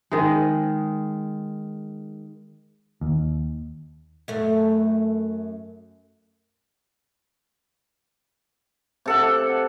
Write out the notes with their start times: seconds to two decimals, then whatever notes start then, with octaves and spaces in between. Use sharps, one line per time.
0.12 D#3 G#3
3.01 D#2
4.28 F#2 A3
9.06 C3 A4 F#5